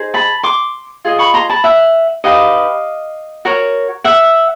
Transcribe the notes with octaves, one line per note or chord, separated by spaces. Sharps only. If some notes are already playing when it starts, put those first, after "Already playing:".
Already playing: D#4 G#4 C5
A5 B5
C6 D6
F4 G#4 D#5
B5 C#6
A#5 C6
A5 B5
E5 F#5
D#4 G4 B4 D#5 F5
F#4 A#4 C#5
E5 F#5